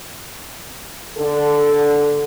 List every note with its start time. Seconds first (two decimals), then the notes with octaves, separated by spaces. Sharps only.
1.18 D3 A4